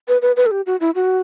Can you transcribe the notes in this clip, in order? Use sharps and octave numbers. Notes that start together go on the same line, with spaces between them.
B4
B4
B4
A4
G4
F#4
E4
F#4